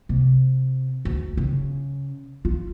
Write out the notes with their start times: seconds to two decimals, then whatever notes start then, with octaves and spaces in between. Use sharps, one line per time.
0.09 C3
1.05 D2
1.37 C#3
2.45 F4